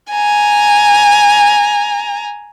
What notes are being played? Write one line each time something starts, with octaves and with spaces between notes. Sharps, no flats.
G#5 A#5